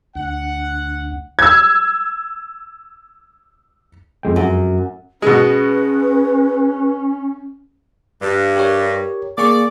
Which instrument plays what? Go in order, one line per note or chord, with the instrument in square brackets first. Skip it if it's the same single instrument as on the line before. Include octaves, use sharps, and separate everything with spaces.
[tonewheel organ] D2 [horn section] F#5
[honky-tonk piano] E6 G#6
[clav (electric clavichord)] F2 G#3 G5
[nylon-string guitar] F#2
[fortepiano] B2 G#3 [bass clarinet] C#4 [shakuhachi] B4
[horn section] G2
[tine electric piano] G4 A#4 C#5
[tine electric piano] A#3 G#4 C#6 [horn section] D5